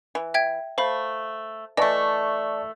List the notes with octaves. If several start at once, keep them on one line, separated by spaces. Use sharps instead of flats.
E3
E5 G5 G#6
A3 C5 F5 B5
E3 A3 D5 D#5 A5 C#6